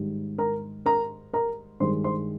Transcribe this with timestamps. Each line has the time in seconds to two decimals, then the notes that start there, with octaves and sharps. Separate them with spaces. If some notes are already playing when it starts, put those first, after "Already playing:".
Already playing: G#2 D#3 G3
0.38 A#4 A#5
0.86 A#4 A#5
1.33 A#4 A#5
1.80 G2 D#3 G#3 C5 C6
2.04 C5 C6